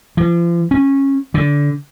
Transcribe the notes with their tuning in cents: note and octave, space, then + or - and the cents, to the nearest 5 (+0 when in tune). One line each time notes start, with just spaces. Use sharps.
F3 -40
C#4 -15
D3 -20